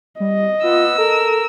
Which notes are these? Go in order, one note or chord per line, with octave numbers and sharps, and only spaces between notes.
G3 D#5
B3 F4 E6
A4 A#4